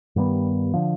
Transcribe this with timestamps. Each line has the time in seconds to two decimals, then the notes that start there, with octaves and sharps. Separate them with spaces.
0.16 G2 D#3 G3 B3
0.74 D3 F3